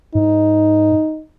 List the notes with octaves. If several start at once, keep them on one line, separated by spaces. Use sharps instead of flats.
G#2 D#4